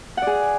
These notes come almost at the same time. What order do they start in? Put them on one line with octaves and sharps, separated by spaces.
F#5 D5 G#4